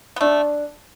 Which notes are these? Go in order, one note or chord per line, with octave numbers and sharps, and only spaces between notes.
B3
A3 D4